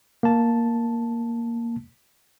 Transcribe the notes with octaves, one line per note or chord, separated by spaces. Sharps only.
A#3 A5